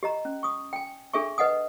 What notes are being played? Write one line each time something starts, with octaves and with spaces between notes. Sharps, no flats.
G4 D#5 A#5
C#4
C#6 D#6
G5 G#5
D4 G#4 A4 E5 G#5 C#6
B4 D#5 F#5 G#5 D#6